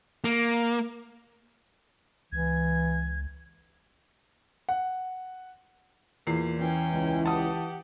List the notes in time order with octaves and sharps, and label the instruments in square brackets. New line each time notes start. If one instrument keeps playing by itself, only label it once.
[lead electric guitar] A#3
[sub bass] C#2 [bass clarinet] E3 [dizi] G#6
[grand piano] F#5
[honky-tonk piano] E2 C7 [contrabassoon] A#2
[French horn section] E3 [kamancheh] C#4 G5
[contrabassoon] C#2
[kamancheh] G4 F#5 [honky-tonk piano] A5 D#6